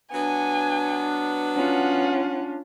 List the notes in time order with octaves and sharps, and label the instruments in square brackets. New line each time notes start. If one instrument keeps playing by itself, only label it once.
[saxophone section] F#3 B3 [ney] D4 [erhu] G#5
[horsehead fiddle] C#4 F4 [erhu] F#5